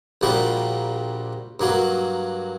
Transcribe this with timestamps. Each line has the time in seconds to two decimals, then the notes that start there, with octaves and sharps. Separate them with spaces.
0.21 A#1 A#2 G3 A#3 F#4
1.60 G2 F#3 A#3 F#4